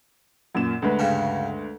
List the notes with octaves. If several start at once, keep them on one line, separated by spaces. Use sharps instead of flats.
F#2 A#2 E7
D2 G#3 B4
G2 C#3